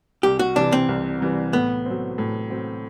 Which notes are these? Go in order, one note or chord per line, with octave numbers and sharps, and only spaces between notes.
C2 G4
F#4
C3 E3 G3 D4
C4
C2
C3 E3 G3
A2 B3
F#3 C4
A2
F#3 C4